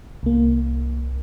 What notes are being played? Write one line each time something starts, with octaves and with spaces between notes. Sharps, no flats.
C2 A#3